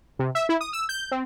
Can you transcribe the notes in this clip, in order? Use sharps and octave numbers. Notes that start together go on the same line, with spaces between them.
C3
E5
E4
D#6
E6
G6
C4